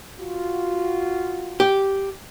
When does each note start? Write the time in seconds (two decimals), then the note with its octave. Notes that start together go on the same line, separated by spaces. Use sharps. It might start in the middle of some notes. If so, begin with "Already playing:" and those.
0.19 F4 F#4
1.60 G4